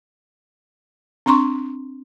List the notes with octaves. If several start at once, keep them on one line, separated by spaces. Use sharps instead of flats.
C4 D4 A#5 C6 C#6